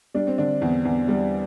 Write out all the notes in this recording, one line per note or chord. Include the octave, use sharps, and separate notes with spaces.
G3 D4
C4
D3 D4
E2
E2
G3